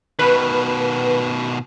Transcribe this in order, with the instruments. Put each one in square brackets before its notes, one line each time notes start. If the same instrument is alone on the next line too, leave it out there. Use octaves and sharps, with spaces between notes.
[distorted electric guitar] B2 D#3 [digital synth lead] B4